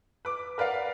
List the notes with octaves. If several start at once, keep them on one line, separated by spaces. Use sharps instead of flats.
B4 D6
A#4 B4 D5 F5 F#5